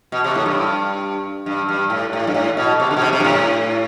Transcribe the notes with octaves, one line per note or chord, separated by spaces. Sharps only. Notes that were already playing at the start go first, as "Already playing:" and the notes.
B2
C3
A2
G2
G2
G2
A2
A2
G2
A2
B2
C3
D3
B2
C3
C3
G2
A2